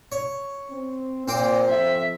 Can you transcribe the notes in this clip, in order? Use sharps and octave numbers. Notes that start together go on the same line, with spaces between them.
C#5
C4
A#2 C4 C5 D6
F2 E5